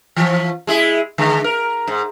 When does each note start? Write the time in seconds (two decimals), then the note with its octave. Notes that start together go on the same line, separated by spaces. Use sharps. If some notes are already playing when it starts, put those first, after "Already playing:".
0.16 E3 F3
0.67 G#3 E4 G#4
1.18 D3 G#3
1.44 A#4
1.87 G#2